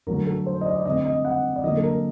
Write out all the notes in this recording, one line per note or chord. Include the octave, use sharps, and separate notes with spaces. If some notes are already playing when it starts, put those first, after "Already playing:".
D3 F#3 A3 A#4
A4
C5
D#5
D5
D5
D3 A3 C4 D#5
D#5
F#5
D5
D3 F#3 A#3 D#5
A4
A#4